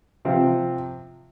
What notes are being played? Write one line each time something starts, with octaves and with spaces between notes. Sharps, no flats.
C3 F3 C4 F4